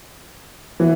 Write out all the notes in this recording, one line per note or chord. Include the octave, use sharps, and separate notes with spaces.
E3 B3